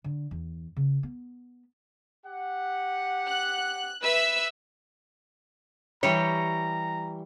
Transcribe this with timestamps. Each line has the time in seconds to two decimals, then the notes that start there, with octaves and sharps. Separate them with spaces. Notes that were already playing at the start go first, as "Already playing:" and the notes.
0.04 D3
0.31 E2
0.77 C#3
1.03 B3
2.25 G4 F#5
3.28 F#6
4.02 B4 E5 E6
6.03 E3 G3 G4 C#5 A#5